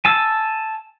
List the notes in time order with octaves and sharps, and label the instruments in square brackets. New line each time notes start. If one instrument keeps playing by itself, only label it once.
[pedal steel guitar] G#5 A5 E6